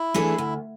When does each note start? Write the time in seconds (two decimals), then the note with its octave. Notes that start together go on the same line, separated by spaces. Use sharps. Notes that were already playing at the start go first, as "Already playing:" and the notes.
Already playing: E4
0.14 E3 A3 D4 G#4
0.38 D2